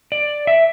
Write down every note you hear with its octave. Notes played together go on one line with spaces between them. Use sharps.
D5
E5